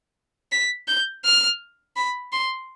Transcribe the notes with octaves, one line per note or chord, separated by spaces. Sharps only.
B6
G6
F6
B5
C6